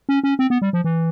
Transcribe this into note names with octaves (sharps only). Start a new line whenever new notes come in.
C#4
C#4
C4
B3
G3
F3
E3